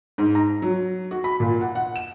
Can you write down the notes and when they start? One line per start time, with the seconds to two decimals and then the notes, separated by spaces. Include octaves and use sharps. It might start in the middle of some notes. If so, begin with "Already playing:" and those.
0.18 G#2
0.35 A#5
0.62 F#3
1.11 F#4
1.24 B5
1.40 A#2
1.61 F#5
1.75 F#5
1.96 E7